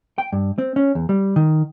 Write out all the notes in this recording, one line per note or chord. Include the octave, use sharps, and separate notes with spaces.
G5
G2
C4
C#4
E2
G3
D#3